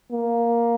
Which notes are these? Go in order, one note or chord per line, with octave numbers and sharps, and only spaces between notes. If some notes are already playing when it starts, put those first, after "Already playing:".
A#3